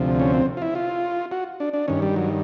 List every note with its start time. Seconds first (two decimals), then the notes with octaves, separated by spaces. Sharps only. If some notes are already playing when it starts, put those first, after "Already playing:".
Already playing: D2 C3 F3
0.20 C#4
0.34 C4
0.57 F4
0.62 E4
0.75 F4
1.31 F#4
1.60 D4
1.73 D4
1.88 G2 D#3 C#4
2.02 G3
2.16 F#3